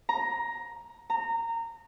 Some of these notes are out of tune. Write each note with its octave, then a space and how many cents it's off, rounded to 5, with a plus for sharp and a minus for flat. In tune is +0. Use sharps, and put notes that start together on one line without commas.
A#5 +10
A#5 -20